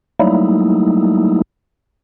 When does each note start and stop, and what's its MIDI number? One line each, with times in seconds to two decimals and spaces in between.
0.19 1.42 54
0.19 1.42 55
0.19 1.42 57
0.19 1.42 58
0.19 1.42 63
0.19 1.42 64